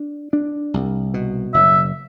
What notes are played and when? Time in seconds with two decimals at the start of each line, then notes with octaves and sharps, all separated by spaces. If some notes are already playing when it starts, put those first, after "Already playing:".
Already playing: D4
0.33 D4
0.74 C2
1.14 B2
1.54 F#1 E5